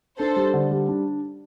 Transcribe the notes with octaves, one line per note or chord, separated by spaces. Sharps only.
D4 A4 C5
G3
D3
G3
D4